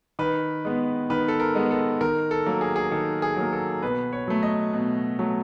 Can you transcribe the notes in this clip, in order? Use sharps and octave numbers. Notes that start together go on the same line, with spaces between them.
D#3 B4
G#3 B3
D#3 B4
A4
A#4
G#3 B3
A4
D#3 A#4
A4
F#3 A#3
G#4
G#4
D#3 A4
G#4
F#3 A#3
A4
B2 B4
C#5
F#3 A3
D#5
B2
F#3 A3